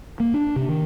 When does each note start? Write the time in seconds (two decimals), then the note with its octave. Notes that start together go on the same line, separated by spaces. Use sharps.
0.20 A#3
0.34 D4
0.56 C3
0.68 D#3